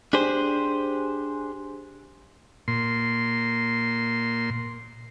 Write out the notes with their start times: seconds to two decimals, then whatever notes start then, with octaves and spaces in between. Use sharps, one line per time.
0.13 D4 G4 G#4 C5
2.68 A#2 C6